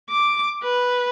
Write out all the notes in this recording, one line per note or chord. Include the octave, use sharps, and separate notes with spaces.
D6
B4